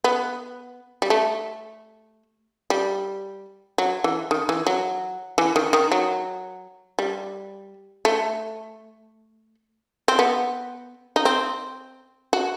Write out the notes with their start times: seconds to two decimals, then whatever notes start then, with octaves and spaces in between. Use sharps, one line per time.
0.04 B3
1.02 G3
1.10 A3
2.70 G3
3.78 F#3
4.04 E3
4.31 D#3
4.49 E3
4.67 F#3
5.38 E3
5.56 D#3
5.73 D#3
5.92 F#3
6.99 G3
8.05 A3
10.08 C4
10.19 B3
11.16 D#4
11.25 C4
12.33 F#4